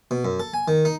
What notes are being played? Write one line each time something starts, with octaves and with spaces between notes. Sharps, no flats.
B2
F#2
A4
G#5
D#3
D#4